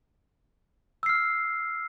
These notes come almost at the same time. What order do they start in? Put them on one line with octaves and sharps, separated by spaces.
E6 C7 F6